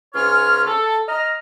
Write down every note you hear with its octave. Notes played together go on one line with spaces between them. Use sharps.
C#2 G#2 C#4 F4 C#5 F6
A4
D#5 A#5 F6